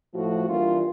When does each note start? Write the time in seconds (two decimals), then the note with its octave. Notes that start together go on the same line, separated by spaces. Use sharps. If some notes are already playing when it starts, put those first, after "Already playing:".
0.14 A2 F3 A3 F#4
0.48 G2 E3 G3 A#3 F4